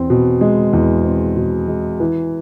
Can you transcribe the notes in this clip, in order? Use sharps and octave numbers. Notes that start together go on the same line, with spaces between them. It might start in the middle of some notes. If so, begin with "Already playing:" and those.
Already playing: E2 C4
B2
G#3
E2
C4
B2
G#3
E3